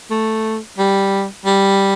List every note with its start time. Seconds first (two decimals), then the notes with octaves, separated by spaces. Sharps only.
0.11 A3
0.78 G3
1.46 G3